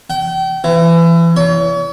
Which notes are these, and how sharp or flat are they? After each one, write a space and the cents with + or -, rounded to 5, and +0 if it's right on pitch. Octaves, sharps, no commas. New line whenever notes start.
G5 -35
E3 +30
C#5 +40